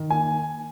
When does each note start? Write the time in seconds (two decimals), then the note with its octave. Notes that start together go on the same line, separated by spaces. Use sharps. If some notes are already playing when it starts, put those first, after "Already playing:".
Already playing: D#3
0.10 A#3 G#5